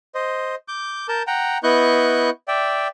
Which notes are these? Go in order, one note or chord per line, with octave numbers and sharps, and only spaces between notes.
C5 D#5
D6 G6
A#4 A5 G6
F#5 G5 A#5
B3 E4 D#5 C#6 F#6 G6
D5 E5 G5